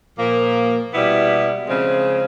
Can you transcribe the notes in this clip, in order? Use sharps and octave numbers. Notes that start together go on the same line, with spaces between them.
A#2 F3 A#3
B2 G3 B3 E4
C#3 F3 G#3 C4